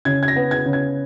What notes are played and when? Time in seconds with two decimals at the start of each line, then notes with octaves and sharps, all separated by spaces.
0.05 C#3 G#6
0.23 G#6
0.28 A#6
0.36 B3
0.51 G#6
0.66 C#3
0.73 G#6